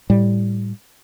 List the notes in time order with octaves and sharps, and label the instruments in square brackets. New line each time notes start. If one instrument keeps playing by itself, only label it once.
[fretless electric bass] A2 G3